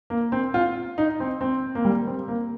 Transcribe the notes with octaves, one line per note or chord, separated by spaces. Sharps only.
A#3
C4
F4
D#4
C4
C4
A#3
G3
C4
A#3